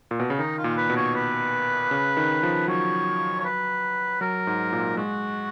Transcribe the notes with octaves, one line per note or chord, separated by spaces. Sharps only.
A#2
B2
C#3
D#3 D#4
F4
A#2
B4
B2
C#5
B4
C#3
D#3
F3
F#3 C#5
C#5
B4
F#3 A#4
G#2
A#2
G#3 F#4